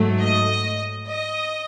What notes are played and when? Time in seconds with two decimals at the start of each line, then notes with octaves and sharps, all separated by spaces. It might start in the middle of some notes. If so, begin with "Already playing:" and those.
Already playing: G#2 F#3 A3
0.20 D#5
1.07 D#5